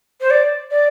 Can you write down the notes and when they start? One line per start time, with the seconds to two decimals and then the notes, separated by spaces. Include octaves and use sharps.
0.20 C5
0.30 D5
0.70 D5